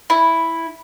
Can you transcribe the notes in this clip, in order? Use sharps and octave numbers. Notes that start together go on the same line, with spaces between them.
E4